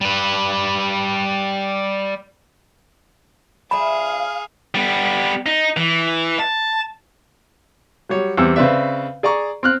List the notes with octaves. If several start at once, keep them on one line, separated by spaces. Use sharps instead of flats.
G3 B4
F3 D4 G#4 E5 F5 B5
G3 B3
D#4
E3
A5
F#3 G3 C#5
E2 G3 C4 E6
C#3 C4 B4 D5 E5
G#4 D5 A#5 C#6
C4 F6 F#6